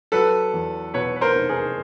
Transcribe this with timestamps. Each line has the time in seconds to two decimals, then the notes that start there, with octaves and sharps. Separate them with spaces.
0.12 F#3 A4 B4
0.54 E2
0.94 B2 B4 C#5
1.16 B4
1.21 A#4 C5
1.36 F1
1.49 G#4 A#4